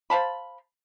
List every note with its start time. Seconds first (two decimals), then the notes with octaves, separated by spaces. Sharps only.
0.10 C5 F5 A5 B5